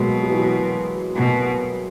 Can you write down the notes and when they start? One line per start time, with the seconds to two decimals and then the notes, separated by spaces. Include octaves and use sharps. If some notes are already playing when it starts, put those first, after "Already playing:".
Already playing: B2 F#3 G#3 A#3 B3
0.23 F#3
0.30 E3
0.38 F#3
1.16 B2